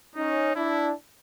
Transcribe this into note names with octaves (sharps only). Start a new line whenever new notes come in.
C#4 D#4
D4 E4